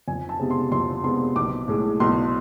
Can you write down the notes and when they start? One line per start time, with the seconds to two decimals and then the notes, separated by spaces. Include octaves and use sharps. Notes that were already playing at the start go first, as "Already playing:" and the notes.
0.08 F2 G#5
0.29 A5
0.39 C3 G#3 B3
0.51 C6
0.72 F2 C6
1.04 C3 G#3 B3 C6
1.36 B1 D6
1.68 A2 G#3
2.00 B1 C6